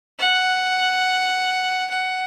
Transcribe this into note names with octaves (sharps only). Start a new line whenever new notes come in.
F#5
F#5